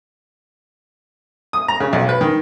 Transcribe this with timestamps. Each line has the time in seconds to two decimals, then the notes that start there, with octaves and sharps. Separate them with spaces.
1.53 D#6
1.68 A#5
1.80 C#3
1.93 B1
2.09 B4
2.21 D#3